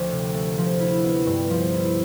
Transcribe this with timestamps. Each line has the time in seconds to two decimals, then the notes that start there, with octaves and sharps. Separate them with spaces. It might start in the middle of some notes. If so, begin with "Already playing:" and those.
Already playing: D2 F3 A3
0.12 C3
0.34 A3
0.58 F3
0.80 E4
1.03 B3
1.27 G2
1.50 F3
1.73 E4